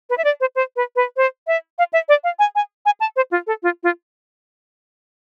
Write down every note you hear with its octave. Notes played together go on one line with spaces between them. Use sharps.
B4
E5
D5
C5
C5
B4
B4
C5
E5
F5
E5
D5
F5
G#5
G#5
G#5
A5
C5
F4
A4
F4
F4